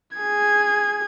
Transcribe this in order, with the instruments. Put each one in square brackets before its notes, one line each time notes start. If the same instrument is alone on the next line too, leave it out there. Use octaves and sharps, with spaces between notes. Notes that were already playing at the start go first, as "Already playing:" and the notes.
[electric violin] G#4 G#6